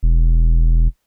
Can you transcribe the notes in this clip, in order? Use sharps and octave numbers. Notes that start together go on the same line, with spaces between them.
E1